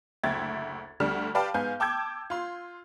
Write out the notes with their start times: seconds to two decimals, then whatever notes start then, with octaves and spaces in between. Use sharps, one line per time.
0.23 F#1 D2 E5 G5 G#6 A6
1.00 D2 D3 G3 F6
1.35 G4 B4 D5 F5 G5 A5
1.54 G#2 B3 F5 G#5 G6
1.80 G5 A5 D6 E6 G6 G#6
2.30 F4 C6